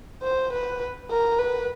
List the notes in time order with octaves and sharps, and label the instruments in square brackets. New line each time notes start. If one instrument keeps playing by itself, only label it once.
[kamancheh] C5
B4
A#4
B4